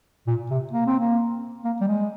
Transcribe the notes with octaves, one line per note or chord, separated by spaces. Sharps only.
A#2
C3
A#3
C4
A#3
A#3
G3
G#3